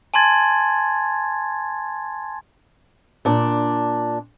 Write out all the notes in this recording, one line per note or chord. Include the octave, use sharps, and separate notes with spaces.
G#5 A5 C6 G#6 A6
A#2 D4